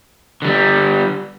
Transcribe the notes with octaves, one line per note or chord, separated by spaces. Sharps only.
D3 G3